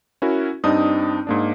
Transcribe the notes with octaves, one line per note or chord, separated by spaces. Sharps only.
C#4 E4 F#4 A#4
G2 C4 D4 D#4 D#6
G#2 A#3 D4